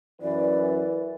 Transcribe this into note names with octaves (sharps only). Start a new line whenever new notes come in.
F#2 E3 B4 D5